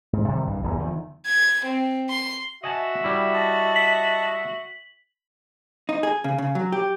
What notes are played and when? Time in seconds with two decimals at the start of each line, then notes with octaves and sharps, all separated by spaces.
0.13 G#2
0.28 C3 D#3 G3
0.47 C2 G2
0.63 D#1 E2 G#2
0.77 E2 D3 D#3 F3
1.26 G#6
1.65 C4
2.10 C6
2.64 F#4 D#5 E5 G#5 A5
3.04 G3 E4
3.34 D#5 A5
3.75 B6 F#7
5.89 D#4
6.03 G#4
6.24 C#3
6.38 C#3
6.55 F#3
6.72 G4